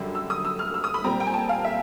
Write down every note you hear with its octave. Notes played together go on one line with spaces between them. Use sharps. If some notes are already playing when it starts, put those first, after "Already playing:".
Already playing: F#2 D3 G3
E6
D#6
E6
F6
E6
D#6
B5
A#2 G3 C4 A#5
G5
G#5
A5
F5
E5